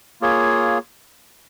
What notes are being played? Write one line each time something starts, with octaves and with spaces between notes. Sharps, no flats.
A#3 F4 G#4 C#5